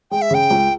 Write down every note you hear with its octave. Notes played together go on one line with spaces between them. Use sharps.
G#3 G5
E5
C#3 G5
C#2